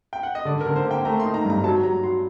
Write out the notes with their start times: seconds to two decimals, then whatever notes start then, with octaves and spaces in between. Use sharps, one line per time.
0.13 G5
0.23 F#5
0.35 D#5
0.45 D3 D5
0.61 A#4
0.66 D3
0.76 C5
0.85 A#3
0.91 G5
1.05 A3 A#5
1.20 C6
1.25 D#4
1.34 A#5
1.45 G2
1.50 A#5
1.64 F#3 A5
1.83 F#3 A#5
2.03 F#4 C6